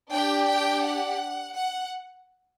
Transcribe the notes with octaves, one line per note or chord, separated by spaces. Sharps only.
D4 G4 G5
G5
F#5
F#5